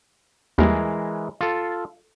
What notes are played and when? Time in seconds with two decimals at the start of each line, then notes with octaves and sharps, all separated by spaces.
0.58 D#2 E3 G3 G#3 A#4
1.41 F4 A4